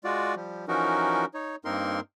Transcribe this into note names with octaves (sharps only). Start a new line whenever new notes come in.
G#3 F4 F#4 D5
F3 G3
E3 F3 C#4 D#4 F#4 A#4
D#4 C#5
G2 A#3 C4 D#4 A#4 C6